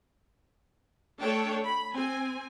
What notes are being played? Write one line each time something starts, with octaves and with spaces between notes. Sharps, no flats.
A3 D4 A4 C#5 G5 A5
B5
C4 G#5